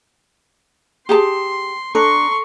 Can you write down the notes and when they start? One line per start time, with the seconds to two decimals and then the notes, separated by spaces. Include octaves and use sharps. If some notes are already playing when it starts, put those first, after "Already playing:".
1.09 G4 G#4 A5 C6
1.95 D4 A4 A#5 C6 C#6